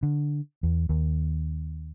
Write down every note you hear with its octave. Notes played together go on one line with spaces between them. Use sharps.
D3
E2
D#2